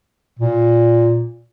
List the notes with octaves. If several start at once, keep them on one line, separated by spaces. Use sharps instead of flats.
A#2